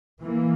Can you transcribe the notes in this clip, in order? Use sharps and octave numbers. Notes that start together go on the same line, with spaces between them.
E3 A#3